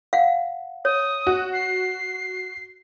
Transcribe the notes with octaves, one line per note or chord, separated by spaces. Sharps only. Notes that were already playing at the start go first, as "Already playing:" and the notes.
F5 F#5
C#5 D#6
F#4
C7